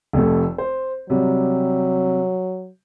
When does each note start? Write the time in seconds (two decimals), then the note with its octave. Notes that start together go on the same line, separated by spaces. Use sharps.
0.13 F1 F2 A3
0.58 C5
1.10 C3 F#3 G3